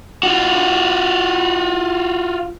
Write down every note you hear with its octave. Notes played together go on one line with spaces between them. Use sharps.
F4 F#4